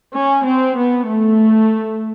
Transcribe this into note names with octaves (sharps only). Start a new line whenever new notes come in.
C#4
C4
B3
A3